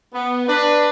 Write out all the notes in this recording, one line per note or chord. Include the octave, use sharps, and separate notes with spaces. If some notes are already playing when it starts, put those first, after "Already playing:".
B3
D4 B4